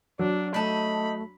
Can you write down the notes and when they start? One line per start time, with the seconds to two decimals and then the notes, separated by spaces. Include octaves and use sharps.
0.19 F#3 D4
0.54 A3 D#4 A5 B5